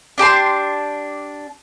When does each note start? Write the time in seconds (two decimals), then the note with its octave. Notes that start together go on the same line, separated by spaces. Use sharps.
0.18 D4 G4 A5 C6